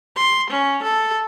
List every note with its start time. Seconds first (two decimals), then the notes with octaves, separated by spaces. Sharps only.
0.16 C6
0.50 C#4
0.83 A4